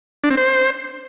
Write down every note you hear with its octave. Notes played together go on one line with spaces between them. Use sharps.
D4
C4
C5